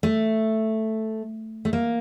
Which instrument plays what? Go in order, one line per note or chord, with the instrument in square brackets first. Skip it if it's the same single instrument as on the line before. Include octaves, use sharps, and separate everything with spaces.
[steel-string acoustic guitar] A3
A3
A#3